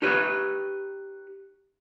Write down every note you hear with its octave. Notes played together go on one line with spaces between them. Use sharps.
D#4 G4 B4 C#5